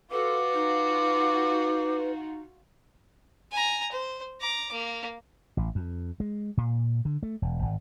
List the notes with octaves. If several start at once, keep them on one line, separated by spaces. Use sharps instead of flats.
F4 F#4 A4 B4 D6
D#4
G#5 A#5
C5
A#5 D6
A#3
A1
F2
G#3
A#2
D3
A3
E1
G#1